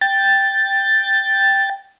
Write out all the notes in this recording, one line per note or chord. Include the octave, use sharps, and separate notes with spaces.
G5 A6